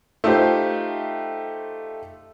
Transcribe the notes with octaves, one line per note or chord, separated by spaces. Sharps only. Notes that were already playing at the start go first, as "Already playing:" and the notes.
A3 D#4 F4 G4 C5